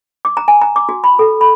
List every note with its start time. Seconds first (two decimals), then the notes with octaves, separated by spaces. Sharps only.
0.25 D6
0.37 A#5
0.48 G#5
0.61 A#5
0.76 D6
0.89 F#4
1.04 B5
1.19 A4
1.41 B5